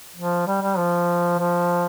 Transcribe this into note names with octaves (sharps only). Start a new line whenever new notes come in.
F3
G3
G3
F3
F3